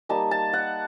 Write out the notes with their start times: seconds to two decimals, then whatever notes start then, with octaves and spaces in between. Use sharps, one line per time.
0.09 G3 A#3 D#4 A5
0.31 A5
0.53 F#5